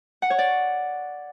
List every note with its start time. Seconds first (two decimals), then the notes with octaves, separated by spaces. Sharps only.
0.22 F#5
0.30 C#5
0.38 D5